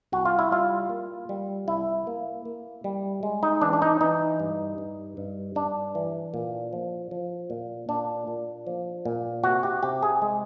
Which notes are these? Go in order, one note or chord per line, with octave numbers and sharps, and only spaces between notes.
C2 F#4
F4
E4
G3 F4
A#3
G3
C2 E4
A#3
A#3
G3
G#3
D#4
E3 D4
D4
D#4
E3 D#4
G2
G2
G2
G2 D4
E3
A#2
F3
F3
A#2
A#2 D4
A#2
F3
A#2
C3 F#4
G4
C3 G4
G#4
G#3